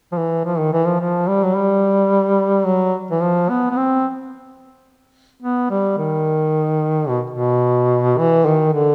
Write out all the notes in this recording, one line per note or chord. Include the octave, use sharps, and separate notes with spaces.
F3
E3
F3
D#3
E3
F3
F3
G3
F#3
G3
F#3
E3
F3
B3
B3
C4
B3
G3
D#3
B2
B2
E3
D#3
D3